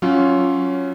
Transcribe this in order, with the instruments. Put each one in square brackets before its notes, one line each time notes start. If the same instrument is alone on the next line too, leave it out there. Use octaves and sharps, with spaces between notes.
[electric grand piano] F#3 C#4 F4